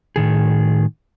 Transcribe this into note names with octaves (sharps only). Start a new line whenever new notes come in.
A2 D#3 G#4